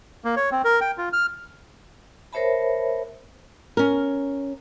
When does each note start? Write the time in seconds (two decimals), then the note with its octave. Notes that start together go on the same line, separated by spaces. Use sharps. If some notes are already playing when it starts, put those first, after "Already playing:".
0.24 A#3
0.36 C#5
0.52 C4
0.64 A#4
0.81 G5
0.98 F4
1.13 F6
2.33 A#4 C5 C#5 E5 A5 B5
3.77 C#4 A#4